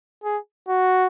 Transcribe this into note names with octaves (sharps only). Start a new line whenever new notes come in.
G#4
F#4